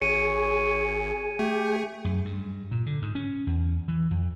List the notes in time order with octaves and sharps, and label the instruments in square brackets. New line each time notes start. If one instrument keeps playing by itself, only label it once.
[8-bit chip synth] G#1 [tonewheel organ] G#4 [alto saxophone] C#5 [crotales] C#7 D#7
[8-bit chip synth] A3 [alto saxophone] G4
[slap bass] F#2
G2
A#2
D3
G#2
C#4
E2
E3
F2